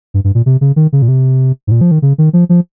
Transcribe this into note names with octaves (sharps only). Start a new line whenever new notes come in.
G2
G2
A#2
C3
C#3
D#3
C#3
A#2
C3
G#2
A#2
F3
D#3
C#3
D#3
F3
F3